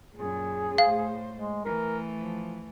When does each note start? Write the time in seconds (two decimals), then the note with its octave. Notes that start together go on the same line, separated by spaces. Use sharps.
0.15 F#2 A#2 G#4
0.78 A2 C5 F5
1.34 G#3
1.65 E3 A3 A#4
2.14 F3